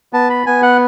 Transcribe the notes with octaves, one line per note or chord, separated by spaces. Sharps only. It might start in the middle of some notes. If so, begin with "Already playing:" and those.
B3 A5
B5
B3 G#5
F#5